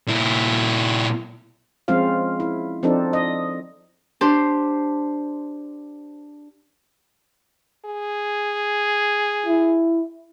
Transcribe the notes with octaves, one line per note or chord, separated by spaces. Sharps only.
A#2 E4
F3 G#3 C4 C#4 F4 F5
E4
F3 C4 D4 D#4 A4
D#5
D4 G4 C5
G#4
E4